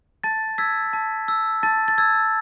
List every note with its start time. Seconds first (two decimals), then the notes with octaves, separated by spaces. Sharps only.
0.24 A5 A6
0.58 E6 G#6 B6
0.93 A5
1.28 E6
1.63 A5 A6
1.88 A6
1.98 E6 G#6